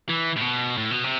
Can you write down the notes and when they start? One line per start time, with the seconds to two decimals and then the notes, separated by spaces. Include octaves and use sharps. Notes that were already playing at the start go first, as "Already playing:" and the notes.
0.09 E3
0.36 A2
0.41 B2
0.77 A2
0.91 B2
1.04 C3